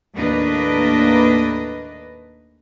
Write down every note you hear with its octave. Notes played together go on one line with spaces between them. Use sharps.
D#2 A2 A#3 D4 B4 D#5